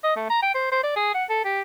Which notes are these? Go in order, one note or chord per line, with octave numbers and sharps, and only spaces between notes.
D#5
A3
A#5
G5
C5
C5
D5
G#4
F#5
A4
G4